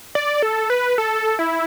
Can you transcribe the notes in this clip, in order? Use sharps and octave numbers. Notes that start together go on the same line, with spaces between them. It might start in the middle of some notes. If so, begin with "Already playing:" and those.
D5
A4
B4
A4
E4